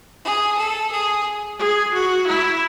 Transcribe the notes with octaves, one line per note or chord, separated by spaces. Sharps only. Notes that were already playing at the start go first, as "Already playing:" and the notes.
G#4
A4
G#4
G#4
F#4
E4